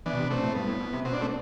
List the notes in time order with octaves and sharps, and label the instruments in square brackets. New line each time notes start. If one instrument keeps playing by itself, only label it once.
[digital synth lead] E3 [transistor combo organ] B3 D4
[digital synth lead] B2
C3
[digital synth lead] B2 [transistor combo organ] A3 C4
[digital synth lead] A2
[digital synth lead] G2 [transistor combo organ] B3
[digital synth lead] A2
B2
C3
[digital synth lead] B2 [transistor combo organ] C4
[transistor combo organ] D4
A3 C4